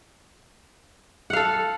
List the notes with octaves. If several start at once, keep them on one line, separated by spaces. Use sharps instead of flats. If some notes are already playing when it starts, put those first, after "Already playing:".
A4 F5 F#5